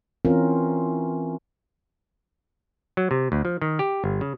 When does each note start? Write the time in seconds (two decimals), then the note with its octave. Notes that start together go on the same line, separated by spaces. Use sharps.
0.25 E3 C4 C#4 F4 A#4
2.97 F#3
3.11 C3
3.32 D2
3.45 F3
3.61 D#3
3.79 G4
4.04 G1
4.21 C#3